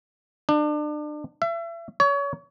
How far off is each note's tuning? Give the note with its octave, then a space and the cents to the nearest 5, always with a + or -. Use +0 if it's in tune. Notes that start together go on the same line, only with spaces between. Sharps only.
D4 +35
E5 +35
C#5 +30